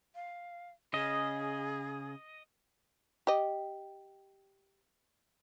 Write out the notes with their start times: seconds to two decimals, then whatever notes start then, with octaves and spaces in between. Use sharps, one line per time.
0.15 F5
0.94 C#3 G#4 D#5
3.27 G4 D#5